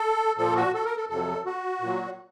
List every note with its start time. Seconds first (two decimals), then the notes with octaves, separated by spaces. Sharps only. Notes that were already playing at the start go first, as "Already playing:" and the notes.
Already playing: A4
0.37 A#2 F3 A4
0.55 F#4
0.74 A4
0.85 A#4
0.97 A4
1.09 F2 C3 F#3 A4
1.46 F#4
1.81 A#2
1.86 F#3